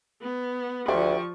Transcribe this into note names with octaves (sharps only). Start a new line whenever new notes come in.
B3
D2 F3 G4 D5 C6 C#6